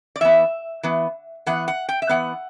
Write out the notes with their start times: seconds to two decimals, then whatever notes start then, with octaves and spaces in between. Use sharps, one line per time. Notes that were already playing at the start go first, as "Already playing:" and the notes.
0.16 D5
0.21 E3 B3 E5
0.83 E3 B3
1.46 E3 B3 F#5
1.68 F#5
1.89 G5
2.02 E5
2.09 E3 B3 F#5